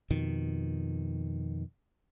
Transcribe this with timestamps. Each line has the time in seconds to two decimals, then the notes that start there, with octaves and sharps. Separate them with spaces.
0.10 F2 B2 D#3